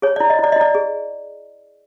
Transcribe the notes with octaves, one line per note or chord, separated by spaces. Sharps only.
G#4 C#5
E4 D5
D#5
E4 D5
D#5
E4 D5
G#4